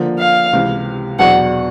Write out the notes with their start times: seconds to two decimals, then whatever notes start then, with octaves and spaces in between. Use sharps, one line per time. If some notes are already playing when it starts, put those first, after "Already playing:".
Already playing: D3 F3 A#3
0.19 F5
0.53 C#2 C3 E3
1.19 E2 B2 F#3 B3 D4 F#5